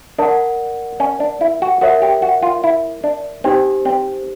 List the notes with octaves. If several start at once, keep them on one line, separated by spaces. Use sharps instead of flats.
D4 A#4 D5 F#5
C#4
D4
E4
F#4
F#4 A#4 C#5 E5
G4
F#4
F4
E4
D4
C4 D#4 G4 C5
C4